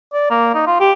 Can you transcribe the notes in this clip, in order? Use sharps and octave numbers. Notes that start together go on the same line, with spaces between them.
D5
A#3
D#4
F4
G4